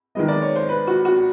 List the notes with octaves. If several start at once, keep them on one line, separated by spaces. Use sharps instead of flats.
D#3 G#3 B3 D#5
D5
C#5
C5
B4
F#4
F#4